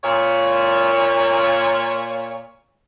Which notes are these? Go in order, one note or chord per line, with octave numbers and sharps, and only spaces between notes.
A#2 C#5